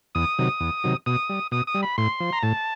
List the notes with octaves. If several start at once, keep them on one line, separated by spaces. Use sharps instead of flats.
E2 D#6
C3 D#3 F#3
E2
C3 D#3 F#3
B2 D#6
G3
B2 D#6
D#6
G3
B5
A2 C6
F3
A#5
A2 A5